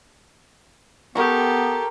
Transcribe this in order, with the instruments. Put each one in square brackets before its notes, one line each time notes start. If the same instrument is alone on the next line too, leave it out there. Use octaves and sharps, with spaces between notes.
[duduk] B3 [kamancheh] G4 A4 [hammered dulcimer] A#4 C#6